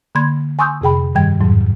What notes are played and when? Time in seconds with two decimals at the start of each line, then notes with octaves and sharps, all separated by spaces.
0.15 D3 A#3 B5 C6 G#6
0.59 G#5 C6 C#6 D#6 E6 G6
0.81 F2 C3 G#4 G5 B5
1.15 G2 D#3 G3 G5 G#6
1.40 F2 G#2 F#3